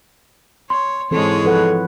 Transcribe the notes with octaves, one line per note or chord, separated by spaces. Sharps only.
C#5 C6
G#2 E3 G#3 C4 A4 C#5
F3 A4 B4 F#5